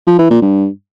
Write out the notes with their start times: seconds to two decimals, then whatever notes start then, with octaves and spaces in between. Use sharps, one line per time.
0.07 F3
0.19 E3
0.30 A#2
0.42 G2